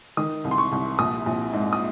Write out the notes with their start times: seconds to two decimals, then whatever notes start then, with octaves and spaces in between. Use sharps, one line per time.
0.17 D#3 D#6
0.45 C2
0.51 C6
0.58 C#6
0.72 C2
0.99 A#1 D#6
1.26 A#1
1.53 G#2
1.73 D#6